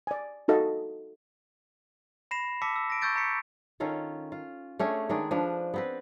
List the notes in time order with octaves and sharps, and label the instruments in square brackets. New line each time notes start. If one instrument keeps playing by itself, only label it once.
[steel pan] D5 G#5
D#4 F#4 A4 D#5 F5
[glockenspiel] B5 A#6 C7 E7
A5 D6 E6 B6 C#7
E6
A#6 D7
C#6 E6 G6 A6 D7
A#5 C#6 B6 C#7
[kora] D#3 C#4 F4 A4
F4
A3 C#4 D4 G#4
D#3 G#3 D4 G#4
F3 D4 B4
B3 C4 B4